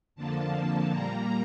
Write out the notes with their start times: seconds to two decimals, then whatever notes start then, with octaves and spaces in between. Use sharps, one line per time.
0.15 F2 D3 F3 A#3 A5
0.53 A5
0.91 A#2 G3 A#3 A#5